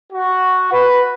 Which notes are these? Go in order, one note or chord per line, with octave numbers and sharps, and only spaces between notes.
F#4
B4